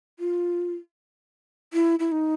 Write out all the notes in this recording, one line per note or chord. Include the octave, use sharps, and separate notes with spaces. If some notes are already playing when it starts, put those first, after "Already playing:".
F4
E4
E4
D#4